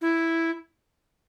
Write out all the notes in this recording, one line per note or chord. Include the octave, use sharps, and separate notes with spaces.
E4